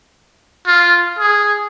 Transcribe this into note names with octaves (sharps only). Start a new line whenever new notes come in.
F4
G#4